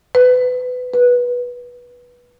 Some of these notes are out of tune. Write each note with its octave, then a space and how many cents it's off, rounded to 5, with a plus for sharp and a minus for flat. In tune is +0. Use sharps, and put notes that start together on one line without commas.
B4 +25
B4 -15